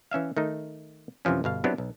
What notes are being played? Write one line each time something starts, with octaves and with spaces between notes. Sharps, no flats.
E3 C#4 E5 F5
D#3 A3 D#4
F#2 C3 E3 F3 C#4
G1 B2 F5
F#3 B3 C4 D4 E4 G4
B1